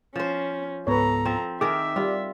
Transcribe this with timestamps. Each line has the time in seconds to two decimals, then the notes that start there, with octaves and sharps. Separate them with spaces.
0.16 F3 C#4 C5
0.87 C#2 G#2 B3 A4 B4 C#5 A#5
1.25 F3 C4
1.61 D#3 G#4 A#4 E5 D6
1.96 G3 F4